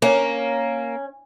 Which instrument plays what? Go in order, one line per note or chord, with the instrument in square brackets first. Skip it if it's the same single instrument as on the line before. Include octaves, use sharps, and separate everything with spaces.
[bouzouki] A#3 [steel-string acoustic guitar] C#4 [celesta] C#5